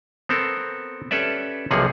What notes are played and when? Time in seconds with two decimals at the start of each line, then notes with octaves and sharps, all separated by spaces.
0.29 B3 C4 A4 A#4
1.11 C#4 G4 A4 B4 D5 E5
1.71 B1 C3 F3 A#3 G#4 F#5